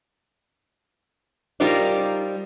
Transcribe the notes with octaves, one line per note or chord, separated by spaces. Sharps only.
G3 D#4 F4 A#4 C5 D5